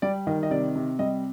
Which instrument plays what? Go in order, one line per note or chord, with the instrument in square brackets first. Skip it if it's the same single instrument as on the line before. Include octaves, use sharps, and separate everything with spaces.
[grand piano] G3 D5
D#3 D#5
D#5
C3 D5
C3
G3 D#5